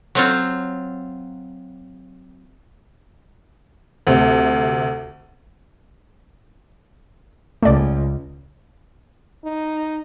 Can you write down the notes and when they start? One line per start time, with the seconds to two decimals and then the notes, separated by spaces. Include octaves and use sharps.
0.15 F#3 C4 F4
4.07 D2 C3
7.63 C#2 A3 D5
9.44 D#4